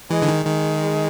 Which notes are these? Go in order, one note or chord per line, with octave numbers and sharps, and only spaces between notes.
E3 G#3
D3
D#3
D#3 G#3